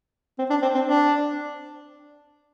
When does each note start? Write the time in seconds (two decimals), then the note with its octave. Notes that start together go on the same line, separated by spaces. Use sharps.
0.38 C4
0.50 D4
0.62 C4
0.74 C4
0.86 D4